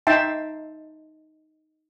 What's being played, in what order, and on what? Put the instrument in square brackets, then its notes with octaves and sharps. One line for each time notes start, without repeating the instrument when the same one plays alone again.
[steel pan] D#4 E5 G5 A5 C6